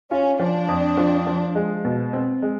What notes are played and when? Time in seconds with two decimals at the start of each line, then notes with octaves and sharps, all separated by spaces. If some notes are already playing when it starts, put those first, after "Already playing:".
0.11 C#4 F4
0.39 F3 D4
0.69 F2
0.97 F3
1.27 F3
1.55 G#3
1.85 B2
2.13 C4
2.42 G#3